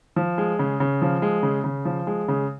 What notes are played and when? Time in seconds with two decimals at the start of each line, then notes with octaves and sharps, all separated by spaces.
0.16 F3
0.38 G#3
0.59 C#3
0.80 C#3
1.02 F3
1.22 G#3
1.43 C#3
1.64 C#3
1.85 F3
2.07 G#3
2.28 C#3